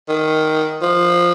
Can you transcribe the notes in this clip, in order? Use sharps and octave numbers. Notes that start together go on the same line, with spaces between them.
D#3
F3